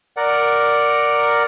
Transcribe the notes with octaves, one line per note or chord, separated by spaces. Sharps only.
A#4 D5 F#5